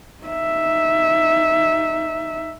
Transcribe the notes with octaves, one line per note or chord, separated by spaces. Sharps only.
D#4 E5